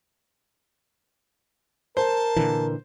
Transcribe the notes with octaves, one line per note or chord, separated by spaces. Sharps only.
A#4 C5 A5
A#2 D3 E3